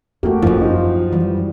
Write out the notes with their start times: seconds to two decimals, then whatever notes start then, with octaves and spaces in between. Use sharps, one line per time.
0.23 E2 A3 A#3 F#4 G4
0.42 A1 F#2 F3 F#3
0.61 D#4 F4
1.12 E3 G3